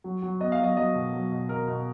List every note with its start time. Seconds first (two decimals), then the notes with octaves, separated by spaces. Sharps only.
0.04 F#3
0.22 F#3
0.40 B3 D#5
0.52 F5
0.60 F#3 D#5
0.77 F#3 D#5
0.95 B2
1.13 F#3
1.32 B2
1.49 B2 A#4
1.68 B2